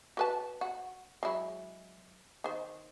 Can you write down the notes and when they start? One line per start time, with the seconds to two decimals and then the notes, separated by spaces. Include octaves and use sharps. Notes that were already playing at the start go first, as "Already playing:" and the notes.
0.17 F#4 B4 A5
0.61 F#4
1.23 F#3 G#3 E4
2.44 D#3 C5